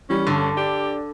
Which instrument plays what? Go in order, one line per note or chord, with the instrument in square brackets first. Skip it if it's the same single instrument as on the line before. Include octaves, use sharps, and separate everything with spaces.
[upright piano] E3 G3 [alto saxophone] C#4
[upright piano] G2 [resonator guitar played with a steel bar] D3
[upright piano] D4 [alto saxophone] G4